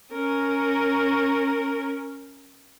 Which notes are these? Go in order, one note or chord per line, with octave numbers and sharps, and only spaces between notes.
C#4 A#4